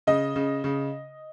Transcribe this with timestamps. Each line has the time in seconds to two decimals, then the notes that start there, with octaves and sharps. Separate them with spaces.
0.07 C#3 D#5
0.36 C#3
0.64 C#3